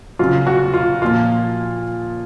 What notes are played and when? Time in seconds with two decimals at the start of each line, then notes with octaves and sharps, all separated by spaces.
0.19 C#3 F#3 F4
0.47 F#4
0.73 F4
1.02 A#2 F3 F4